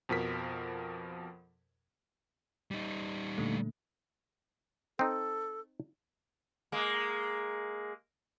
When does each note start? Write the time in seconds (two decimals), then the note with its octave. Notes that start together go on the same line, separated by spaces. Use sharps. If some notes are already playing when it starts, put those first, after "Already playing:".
0.09 F2 B2 F3 A#4 B6
2.71 G3 D#4
3.38 A#2 D3 A3
4.99 C4 D#4 A4
6.72 G#3 A#3